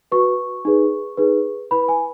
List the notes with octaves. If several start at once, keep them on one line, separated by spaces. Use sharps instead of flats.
F#4 B4 C#6
D#4 G#4 B4
D#4 G#4 B4
E4 B4 B5
G#5